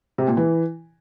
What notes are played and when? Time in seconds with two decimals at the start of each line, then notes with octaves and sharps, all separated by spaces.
0.18 C3
0.28 A#2
0.37 E3